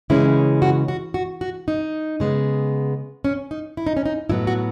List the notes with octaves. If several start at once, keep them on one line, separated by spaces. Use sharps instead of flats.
C#3 E3 G#3 C#4 E4
F#4
F#4
F#4
F#4
D#4
C#3 G#3 B3
C#4
D#4
E4
D#4
C#4
D#4
A2 F#3 B3 E4
F#4